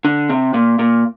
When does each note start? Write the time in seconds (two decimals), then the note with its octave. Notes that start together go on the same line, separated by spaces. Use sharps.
0.05 D3
0.30 C3
0.54 A#2
0.79 A#2